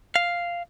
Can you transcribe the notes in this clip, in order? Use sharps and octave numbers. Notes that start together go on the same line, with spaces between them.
F5